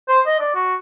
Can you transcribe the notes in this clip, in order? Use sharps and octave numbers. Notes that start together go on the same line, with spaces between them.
C5
D#5
D5
F#4